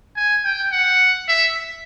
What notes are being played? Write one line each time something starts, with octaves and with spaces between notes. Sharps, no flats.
G#5
G5
F#5
E5